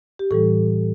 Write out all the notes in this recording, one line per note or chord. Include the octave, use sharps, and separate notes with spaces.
G4
A2 E3 G3 A4